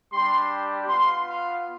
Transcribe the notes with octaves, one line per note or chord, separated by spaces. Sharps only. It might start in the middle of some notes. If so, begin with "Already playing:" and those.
G3 D4 G4 C6
B3 F4 C6
F5